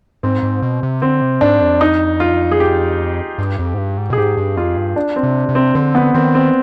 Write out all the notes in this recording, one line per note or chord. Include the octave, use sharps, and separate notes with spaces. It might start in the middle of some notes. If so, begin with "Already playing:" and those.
G#2 C4
G#2
B2
C3
D3 C4
C3
G#2 D4
F2
D#4
F4
G#4
G4
G2
F2
G#2
G2
G#2
B2
G#4
G#2 G4
G2
F2 F4
G2
D4
C4
C3
C3
C4
D3 C4
B3
D#3 C4
C4